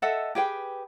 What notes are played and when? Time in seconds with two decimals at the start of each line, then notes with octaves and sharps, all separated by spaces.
0.02 A4 D#5 E5 F#5
0.35 G4 G#4 B4 G5